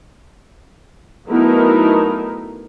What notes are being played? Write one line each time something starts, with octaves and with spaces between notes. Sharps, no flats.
F#3 A3 B3 D#4 E4 A#4